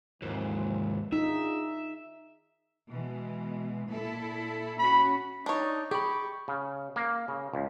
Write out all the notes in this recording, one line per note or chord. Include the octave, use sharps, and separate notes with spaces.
D#2 G#2 E3 F3 C4
D4 D#4 F4 G#4 E5
B2 E3 G#3
A#2 E4 A4
C#4 F#4 B5
D4 D#4 C#5
G4 G#4 B5 C#6
C#3
A#3
C#3
C#2